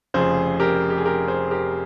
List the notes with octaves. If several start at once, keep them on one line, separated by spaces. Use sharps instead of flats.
F1 F2 C#3 F3 G#4 C5
G4 A#4
G4
G#4
G4 A#4
G#4 C5
G4 A#4